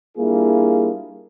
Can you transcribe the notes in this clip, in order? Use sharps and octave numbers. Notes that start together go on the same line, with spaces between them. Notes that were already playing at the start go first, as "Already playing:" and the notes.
G3 A#3 D4 E4 F4 G#4